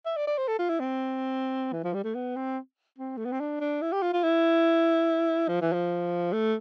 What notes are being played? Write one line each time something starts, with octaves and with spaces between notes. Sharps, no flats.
E5
D5
D5
C5
A4
F4
E4
C4
E3
F3
G3
A3
B3
C4
C4
A3
B3
C4
D4
D4
E4
G4
F4
F4
E4
F3
E3
F3
A3